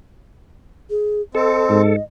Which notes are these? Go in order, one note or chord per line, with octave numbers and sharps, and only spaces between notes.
G#4
C4 A4 D#5
G#2